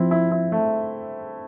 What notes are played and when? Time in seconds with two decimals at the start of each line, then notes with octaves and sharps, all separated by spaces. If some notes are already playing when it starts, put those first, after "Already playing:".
Already playing: F3 C4 E4
0.11 E4
0.32 E4
0.52 A3